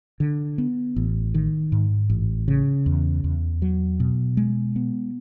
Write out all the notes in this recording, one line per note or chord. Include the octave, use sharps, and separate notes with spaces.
D3
B3
A1
D#3
G#2
A1
C#3
E2
E2
F#3
B2
G#3
B3